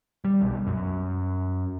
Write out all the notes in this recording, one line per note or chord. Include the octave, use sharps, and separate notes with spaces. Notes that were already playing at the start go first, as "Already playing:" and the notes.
G3
B1
F#2